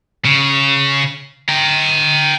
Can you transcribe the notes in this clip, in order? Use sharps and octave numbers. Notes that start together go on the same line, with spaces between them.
C#3
G5 A#5